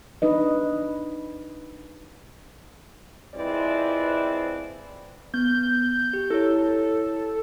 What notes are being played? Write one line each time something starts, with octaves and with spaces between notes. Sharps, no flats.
D4 D#4 B4 D#5
F3 G#3 C4 E4 B4 D5
B3 G6
G4
E4 A4 C#5